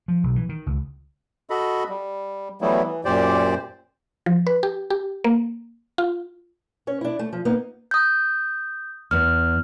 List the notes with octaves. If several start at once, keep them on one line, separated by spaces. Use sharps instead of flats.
F3
B1
E3
D#3
C#2
F#4 A4 D#5 B5
G3
E3 F#3 G3 A3 B3 E4
E3
F#2 A#2 G4 C5 D5
F3
B4
G4
G4
A#3
F4
C#4 C#5
D4 E4
A3
F3
A#3 B3 D#4
D#6 G6
E2 F6